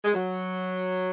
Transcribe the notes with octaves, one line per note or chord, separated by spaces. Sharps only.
G#3
F#3